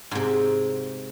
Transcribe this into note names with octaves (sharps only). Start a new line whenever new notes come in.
G#2 C3